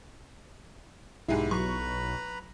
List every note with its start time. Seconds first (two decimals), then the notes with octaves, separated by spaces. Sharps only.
1.29 B1 G#2 G#3 E4 G4
1.51 F#3 B4 A#5 B5 C#6